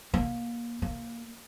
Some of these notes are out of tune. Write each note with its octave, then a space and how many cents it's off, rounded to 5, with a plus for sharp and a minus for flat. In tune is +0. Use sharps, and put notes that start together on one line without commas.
A#3 +20
A#3 +0